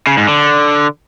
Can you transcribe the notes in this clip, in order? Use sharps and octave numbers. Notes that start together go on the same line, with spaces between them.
C#3
G#2
D3